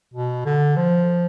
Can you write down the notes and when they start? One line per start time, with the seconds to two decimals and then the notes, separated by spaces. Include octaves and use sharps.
0.14 B2
0.45 D3
0.77 F3